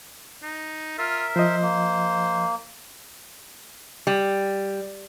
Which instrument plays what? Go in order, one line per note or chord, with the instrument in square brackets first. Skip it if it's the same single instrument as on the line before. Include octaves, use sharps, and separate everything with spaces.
[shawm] D#4
[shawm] F4 [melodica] A#4 E5
[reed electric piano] F3 D#5 [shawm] C5
[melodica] A#3
[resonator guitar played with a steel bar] G3